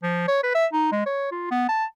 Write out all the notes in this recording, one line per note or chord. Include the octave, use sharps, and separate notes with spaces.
F3
C#5
B4
E5
D#4
G#3
C#5
F4
B3
A5